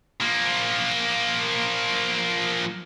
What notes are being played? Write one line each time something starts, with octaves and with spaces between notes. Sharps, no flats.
F3 A#3